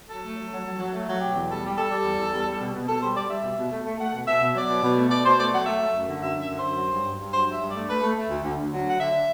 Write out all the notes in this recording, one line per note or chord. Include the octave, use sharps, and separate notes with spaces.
F#3 A4
A3
F#3
F#3
F#3
F#3
A3
F#3
B2 G4
E2
G3 A4
G3
G3 A4
G3
E2
E2
G3
G3
B2
B2
B2 A4
G3 C5
G3 D5
G3 E5
B2
B2
A3
A3
A3 F#5
B2
B2 E5
B2
F#3 D5
B2
B2
A3
B2 D5
B2 C5
A3 D5
F#3 F#5
A3 E5
A3
F#2
D3
F#2 E5
F#2
E5
D3
F#2 C5
F#3
G2
G2
G2
F#3 C5
G2 E5
G2
A3 D5
A3 B4
A3
A3
D2
D2
D2
F#3
D3 F#5
D3 E5